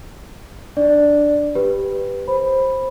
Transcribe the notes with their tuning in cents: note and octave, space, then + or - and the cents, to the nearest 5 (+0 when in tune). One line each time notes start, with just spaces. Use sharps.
D4 +0 D5 +0
G4 +0 B4 +0
C5 +15 B5 +0